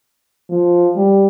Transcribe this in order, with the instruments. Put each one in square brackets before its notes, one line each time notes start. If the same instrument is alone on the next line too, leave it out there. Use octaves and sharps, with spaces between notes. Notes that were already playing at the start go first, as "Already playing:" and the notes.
[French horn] F3
G3